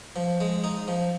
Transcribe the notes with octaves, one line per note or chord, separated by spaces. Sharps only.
F3
G#3
D#4
F3